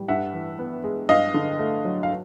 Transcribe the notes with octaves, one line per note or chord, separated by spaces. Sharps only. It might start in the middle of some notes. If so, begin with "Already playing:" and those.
Already playing: A2 G3
G2 E5 F#5
E3
B3
G#3
G2 D#5 F5
D3
A3
F#3
F5